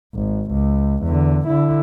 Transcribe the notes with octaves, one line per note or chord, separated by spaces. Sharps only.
G#1
C#2
E2 D3
D3 E4